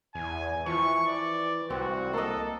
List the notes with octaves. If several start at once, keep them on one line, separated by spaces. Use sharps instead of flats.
E2 G#5
E3 F3 C#6
D5
C2 C4 F#4
A#3 A4 D#5